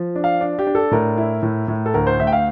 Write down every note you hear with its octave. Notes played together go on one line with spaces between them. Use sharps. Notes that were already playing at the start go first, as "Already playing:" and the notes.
Already playing: F3
D4
F5
D4
G4
D4
A4
A2 A#4
E4
A2
A2
A4
D2 A#4
C5
D2 E5
G5
F5